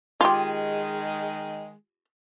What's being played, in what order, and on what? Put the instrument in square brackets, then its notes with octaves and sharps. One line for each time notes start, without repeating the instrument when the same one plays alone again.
[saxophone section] D#3 G#3 [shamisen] F4 G4